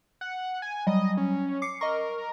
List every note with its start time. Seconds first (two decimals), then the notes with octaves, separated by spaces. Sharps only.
0.21 F#5
0.62 G#5
0.87 F#3 G3 D#5
1.17 C#4
1.62 D6 C7 C#7
1.81 A#4 D#5 C#6